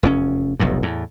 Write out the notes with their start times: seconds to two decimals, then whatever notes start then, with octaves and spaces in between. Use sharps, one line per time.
0.03 F1 E2 C4 C#4
0.60 F1 B1 E2 G2
0.82 E2 A2